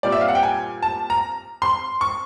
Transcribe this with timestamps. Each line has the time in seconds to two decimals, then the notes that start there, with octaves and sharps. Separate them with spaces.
0.03 A#2 G3 C4 D5
0.12 E5
0.21 F5
0.28 F#5
0.35 G5
0.43 G#5
0.83 A5
1.10 A#5
1.62 C6
2.01 C#6